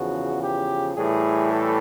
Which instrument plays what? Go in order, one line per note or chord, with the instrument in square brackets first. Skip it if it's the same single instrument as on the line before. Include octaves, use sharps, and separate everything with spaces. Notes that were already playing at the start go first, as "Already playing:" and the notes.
Already playing: [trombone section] E2 C#3 F3 F#4
G4
A2 E3 G3 G#4
A4